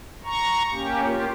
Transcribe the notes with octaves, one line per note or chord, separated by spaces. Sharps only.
A#5 C#6
A#3 C#4 G4
A#3 F4 G4